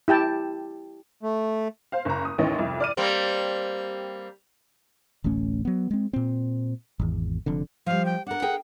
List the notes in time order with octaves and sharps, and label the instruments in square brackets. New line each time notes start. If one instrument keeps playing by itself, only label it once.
[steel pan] E4 G4 G5 A5
[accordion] A3
[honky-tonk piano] C5 F5
F#1 A#5
D#6
A1 D#2 E3 C#4 D#5
C2 F2
D5 F6 D#7
[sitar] G3 A#3 C4
[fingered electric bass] D1 A1 A3 C#4
F#3 B3
G#3 C4
A#2 C4
G#1 E2
F1 F2 D3
[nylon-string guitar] F3 G3 [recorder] F5
[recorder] G5
[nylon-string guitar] D4 A#4 [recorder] F#5
[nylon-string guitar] G#4 A#4 G5